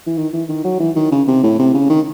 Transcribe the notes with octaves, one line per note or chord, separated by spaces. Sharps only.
E3
D#3
E3
D#3
F#3
E3
D#3
C#3
C3
A2
C3
C#3
D#3